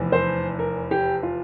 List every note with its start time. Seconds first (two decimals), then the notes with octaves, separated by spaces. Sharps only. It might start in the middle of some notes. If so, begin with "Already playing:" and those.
Already playing: F1 E2 E3
0.12 C5
0.59 A#4
0.91 G4
1.23 F4